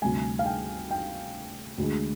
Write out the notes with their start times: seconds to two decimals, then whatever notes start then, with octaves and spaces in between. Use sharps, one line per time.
0.02 D2 C3 G3 G#5
0.39 F5
0.46 G5
0.91 G5
1.78 D2 D3 G#3